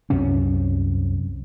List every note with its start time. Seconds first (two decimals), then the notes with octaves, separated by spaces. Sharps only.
0.10 C2 F#2 C3 C#4